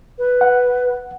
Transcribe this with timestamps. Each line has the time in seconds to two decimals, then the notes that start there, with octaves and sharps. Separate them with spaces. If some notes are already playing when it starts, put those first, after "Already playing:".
0.19 B4
0.41 F#5